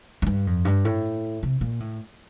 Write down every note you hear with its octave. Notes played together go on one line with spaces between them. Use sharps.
F2
G2
F2
G2
A2
C3
A#2
A2